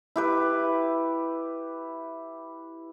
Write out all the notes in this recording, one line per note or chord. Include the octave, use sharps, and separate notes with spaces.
E4 G4 B4